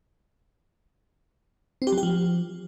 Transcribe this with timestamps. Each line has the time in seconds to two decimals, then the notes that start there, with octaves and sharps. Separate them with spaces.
1.82 C4
1.87 G4
1.92 F#3
1.98 G4
2.03 F3